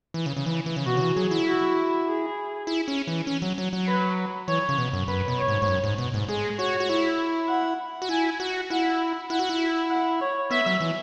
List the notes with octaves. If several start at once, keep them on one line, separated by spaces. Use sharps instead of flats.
E3
C#3
C#3
E3
E3
C#3
B2 F#4
C#3
E3
F#3 G#4
E4
F#4
G#4
E4
C#4
E3
C#4
F#3
F#3
F#3
B4
E3 C#5
C#3
B2
F#2
F#2 B4
B2
C#5
G#2
G#2
F#2
G#2
B2
G#2
G#3 G#4
F#4 C#5
F#4
E4 C#5
F#5
F#4
E4 G#5
F#4
E4 F#5
E4 F#5
F#4
E4
F#5
C#5
B3 E5
F#3
E3